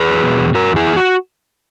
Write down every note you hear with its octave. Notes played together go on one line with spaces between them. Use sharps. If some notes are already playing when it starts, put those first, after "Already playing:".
Already playing: E2 G#4 B4
F#3
B2
E2
B2 F#4 A#4
E2
E4 G#4
E2
F#4